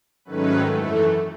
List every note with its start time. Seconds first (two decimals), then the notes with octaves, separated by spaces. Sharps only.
0.25 G#2 D#3 F#3 A3 C#4 B4
0.69 F#2 E3 A3